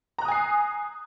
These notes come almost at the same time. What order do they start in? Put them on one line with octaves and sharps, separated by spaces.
A#5 F#6 D#6 G#5 C7